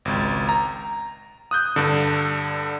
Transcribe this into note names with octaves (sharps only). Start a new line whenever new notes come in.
G#1 C#2
A#5
D#6 F#6 G6
G2 D3